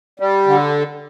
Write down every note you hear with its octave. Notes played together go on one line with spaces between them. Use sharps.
G3
D3